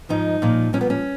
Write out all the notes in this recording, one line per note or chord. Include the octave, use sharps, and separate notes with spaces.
G#2 F3 D#4
A#2 F3
A#2 F3 C#4
B3
C#4